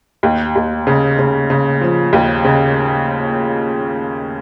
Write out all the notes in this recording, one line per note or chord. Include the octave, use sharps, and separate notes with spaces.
D#2
D#2
C#3
C#3
C#3
F3
D#2
C#3